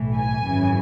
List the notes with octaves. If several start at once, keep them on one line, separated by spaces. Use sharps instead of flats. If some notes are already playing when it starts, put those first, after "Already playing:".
Already playing: B1 A2 E3
G#5
G#1 F#2 C#3 E3